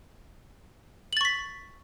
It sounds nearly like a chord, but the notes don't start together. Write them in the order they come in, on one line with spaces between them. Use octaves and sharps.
F#7 A6 C#6 B6